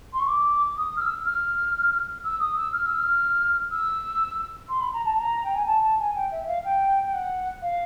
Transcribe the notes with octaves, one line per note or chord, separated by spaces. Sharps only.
C6
C#6
D6
D#6
F6
E6
F6
E6
D#6
E6
F6
E6
F6
E6
C6
B5
A#5
A5
A#5
G5
G#5
A5
A5
G#5
G5
E5
F5
G5
G5
F#5
F5